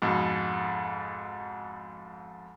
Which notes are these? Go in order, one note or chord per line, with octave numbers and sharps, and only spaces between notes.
F2 G#2 B2